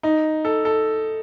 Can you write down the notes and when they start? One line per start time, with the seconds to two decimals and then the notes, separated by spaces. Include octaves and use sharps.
0.03 D#4
0.45 A4
0.65 A4